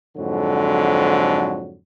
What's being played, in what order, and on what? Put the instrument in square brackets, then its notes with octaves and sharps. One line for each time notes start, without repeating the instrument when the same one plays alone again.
[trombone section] F2 G#2 D3 F#3